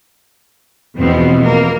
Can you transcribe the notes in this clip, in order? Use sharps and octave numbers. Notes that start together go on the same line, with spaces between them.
E2 B2 F3 B3 C4
A#3 A#4